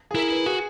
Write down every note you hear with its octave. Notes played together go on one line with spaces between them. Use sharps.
G#4
E4 A#4
B4
F#4 G#4